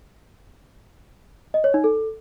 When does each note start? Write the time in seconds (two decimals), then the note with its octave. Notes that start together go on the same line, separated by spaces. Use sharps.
1.54 D#5
1.64 C#5
1.74 D#4
1.84 A4